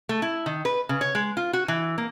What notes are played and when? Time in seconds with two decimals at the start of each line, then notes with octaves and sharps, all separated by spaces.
0.09 A3
0.22 E4
0.46 D#3
0.65 B4
0.89 C#3
1.01 C#5
1.15 G#3
1.37 F4
1.53 F#4
1.68 E3
1.98 A#3